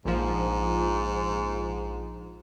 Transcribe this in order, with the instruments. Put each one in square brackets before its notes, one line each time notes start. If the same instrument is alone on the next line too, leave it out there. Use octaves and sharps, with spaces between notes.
[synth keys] A#1 F3 [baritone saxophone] G#2